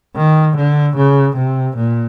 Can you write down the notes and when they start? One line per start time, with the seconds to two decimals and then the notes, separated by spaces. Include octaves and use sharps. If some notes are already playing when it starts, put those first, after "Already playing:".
0.16 D#3
0.57 D3
0.97 C#3
1.37 C3
1.77 A#2